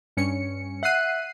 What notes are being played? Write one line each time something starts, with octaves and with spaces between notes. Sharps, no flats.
G2 C#4 C#7
E5 F#5 F#6 C7 D#7